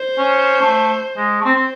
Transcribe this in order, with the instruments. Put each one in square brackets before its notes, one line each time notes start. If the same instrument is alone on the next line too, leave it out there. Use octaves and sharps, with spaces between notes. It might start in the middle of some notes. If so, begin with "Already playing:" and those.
Already playing: [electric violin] C5
[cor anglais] C#4
A3
G#3
A3
[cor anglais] C4 [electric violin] C5
[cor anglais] C4